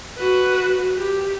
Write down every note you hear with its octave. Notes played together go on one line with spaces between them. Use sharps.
F#4 B4
G4